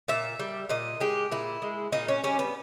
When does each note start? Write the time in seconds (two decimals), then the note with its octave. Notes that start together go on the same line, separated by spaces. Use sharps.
0.08 A#2 E5
0.39 G3
0.69 A#2 D#5
1.00 G#3 G4
1.32 A#2 E4
1.62 G#3
1.92 A#2 D#4
2.08 C#4
2.24 G3 C#4
2.39 B3